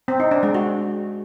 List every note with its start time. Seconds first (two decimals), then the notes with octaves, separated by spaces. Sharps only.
0.08 C4
0.20 D#4
0.31 D4
0.43 G#3
0.55 F#4